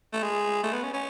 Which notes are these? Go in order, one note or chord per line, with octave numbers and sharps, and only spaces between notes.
A3
G#3
A3
B3
C#4
C#4